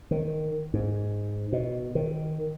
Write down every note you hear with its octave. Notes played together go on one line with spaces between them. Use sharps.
D#3
G#2
B2
D#3